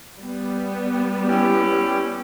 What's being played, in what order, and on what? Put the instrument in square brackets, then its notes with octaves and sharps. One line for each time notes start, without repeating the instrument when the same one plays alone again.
[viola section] G3 B3
[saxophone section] C#4 E4 G4